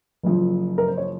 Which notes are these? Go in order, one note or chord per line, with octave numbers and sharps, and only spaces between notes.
F#1 F#2 F3
A#4
C5
C#5